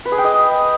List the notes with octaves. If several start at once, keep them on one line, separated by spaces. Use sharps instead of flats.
B4
G#4
G5
D#5